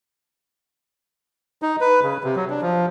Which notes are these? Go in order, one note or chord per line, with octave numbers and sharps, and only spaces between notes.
D#4
B4
C#3
C3
F#3
D4
F3